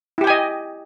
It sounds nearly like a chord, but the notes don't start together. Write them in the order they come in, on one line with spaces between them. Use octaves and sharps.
E4 G4 G5 G#5 D#5